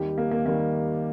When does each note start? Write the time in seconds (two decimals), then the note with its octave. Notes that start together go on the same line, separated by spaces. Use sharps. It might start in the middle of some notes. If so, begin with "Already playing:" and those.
Already playing: D#2 D#3 G3 G4
0.18 A#3
0.31 A#3
0.46 D#3 G3 A#3